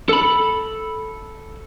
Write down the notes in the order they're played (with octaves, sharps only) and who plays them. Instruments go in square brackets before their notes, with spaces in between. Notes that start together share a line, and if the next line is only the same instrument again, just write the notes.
[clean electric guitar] A4 B5